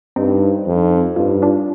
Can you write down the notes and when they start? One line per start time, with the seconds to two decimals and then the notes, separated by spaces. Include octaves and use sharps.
0.16 G2 C4 D#4
0.67 F2
1.16 G2 F4
1.30 D#4
1.42 D4 F4